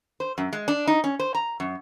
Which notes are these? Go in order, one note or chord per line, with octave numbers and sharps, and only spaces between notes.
C5
F#2
G#3
D4
D#4
C#4
C5
A#5
F#2